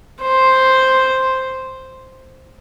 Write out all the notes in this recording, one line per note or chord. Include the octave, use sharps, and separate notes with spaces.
C5